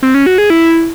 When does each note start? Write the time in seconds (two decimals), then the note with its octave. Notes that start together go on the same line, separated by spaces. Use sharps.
0.03 C4
0.14 C#4
0.26 F#4
0.38 G#4
0.50 E4